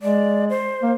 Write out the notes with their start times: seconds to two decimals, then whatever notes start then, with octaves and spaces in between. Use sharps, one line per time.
0.02 G#3 D5
0.49 C5
0.82 A#3